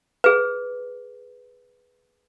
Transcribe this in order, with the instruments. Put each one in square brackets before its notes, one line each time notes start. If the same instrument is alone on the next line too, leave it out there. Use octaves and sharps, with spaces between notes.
[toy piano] G#4 B4